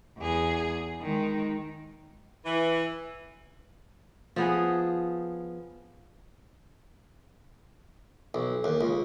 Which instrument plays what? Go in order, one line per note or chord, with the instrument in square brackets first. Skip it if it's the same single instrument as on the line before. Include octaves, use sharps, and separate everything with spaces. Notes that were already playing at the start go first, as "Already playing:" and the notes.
[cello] E2 G#4
D#3 G#3
[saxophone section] E3
[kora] F3 B3 G#4
[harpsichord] B1
D#2
C#2